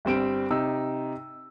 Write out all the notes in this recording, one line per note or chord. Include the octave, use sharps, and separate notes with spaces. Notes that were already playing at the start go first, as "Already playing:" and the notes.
G1 G3 C4 D7
C3 D#4 E6